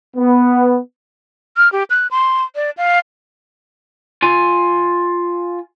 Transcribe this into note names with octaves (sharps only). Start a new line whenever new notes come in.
B3
F6
G4
F#6
C6
D5
F5
F4 G#5